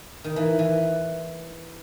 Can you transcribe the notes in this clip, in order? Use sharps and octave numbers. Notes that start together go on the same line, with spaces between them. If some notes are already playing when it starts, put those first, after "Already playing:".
D#3
E3
E3